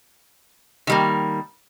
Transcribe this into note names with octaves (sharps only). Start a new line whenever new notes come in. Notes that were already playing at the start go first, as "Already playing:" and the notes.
D#3 G3 A#3